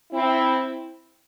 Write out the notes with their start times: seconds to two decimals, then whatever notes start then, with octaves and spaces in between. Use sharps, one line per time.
0.12 C4 E4